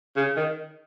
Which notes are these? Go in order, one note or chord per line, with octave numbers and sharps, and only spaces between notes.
C#3
D#3